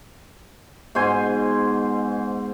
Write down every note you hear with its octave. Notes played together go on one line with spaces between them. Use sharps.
G#2 B2 C5 G#5